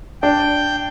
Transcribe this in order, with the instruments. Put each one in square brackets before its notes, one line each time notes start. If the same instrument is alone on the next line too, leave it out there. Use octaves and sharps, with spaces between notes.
[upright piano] D4 [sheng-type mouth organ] G5